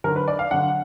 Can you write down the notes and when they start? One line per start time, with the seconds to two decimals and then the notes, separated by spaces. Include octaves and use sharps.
0.04 D3 F#3 A#4
0.16 B4
0.28 D5
0.39 F5
0.51 D3 F#3 F#5